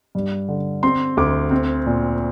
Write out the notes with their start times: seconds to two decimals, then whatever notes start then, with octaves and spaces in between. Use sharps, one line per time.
0.15 G2
0.49 D3
0.83 C4 C6
1.17 D2 D6
1.51 C4
1.86 A#2